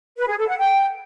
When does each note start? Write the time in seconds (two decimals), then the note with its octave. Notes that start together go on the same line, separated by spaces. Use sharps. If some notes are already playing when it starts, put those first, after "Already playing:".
0.18 B4
0.28 G#4
0.38 A4
0.48 F#5
0.58 G5